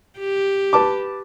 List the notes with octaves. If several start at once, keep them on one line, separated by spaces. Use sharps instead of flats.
G4
B4 A5 D6